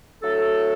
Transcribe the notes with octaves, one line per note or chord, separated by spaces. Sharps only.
F#3 A3 D4 A4